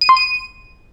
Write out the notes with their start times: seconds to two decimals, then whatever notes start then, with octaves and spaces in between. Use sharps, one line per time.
0.01 D#7
0.09 C6
0.17 D#7